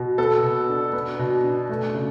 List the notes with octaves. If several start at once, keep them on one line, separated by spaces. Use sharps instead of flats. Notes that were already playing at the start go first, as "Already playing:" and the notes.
Already playing: B2
B3 A4
B2
D4
B3
B2
D4
A3
C#3